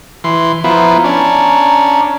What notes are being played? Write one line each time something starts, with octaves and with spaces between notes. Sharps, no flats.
E3 C6
F3 B3 E4 A#5
C#4 D4